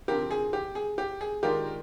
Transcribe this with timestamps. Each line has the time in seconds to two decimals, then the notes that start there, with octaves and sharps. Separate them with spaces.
0.08 D3 F3 C4 G4 A#4
0.31 G#4
0.53 G4
0.75 G#4
0.98 G4
1.21 G#4
1.43 D#3 G#3 D4 F4 G4 A#4